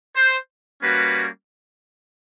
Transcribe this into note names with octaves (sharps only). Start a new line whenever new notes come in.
C5
G3 A#3 C#4 F#4 B4